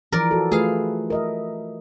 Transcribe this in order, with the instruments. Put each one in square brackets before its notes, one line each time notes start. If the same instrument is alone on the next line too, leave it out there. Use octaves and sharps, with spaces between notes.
[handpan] E3 F3 [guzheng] A#4 D5
[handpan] F#4 A4
[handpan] A3 F4 B4 [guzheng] G#4 F5
[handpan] A#4 D#5 E5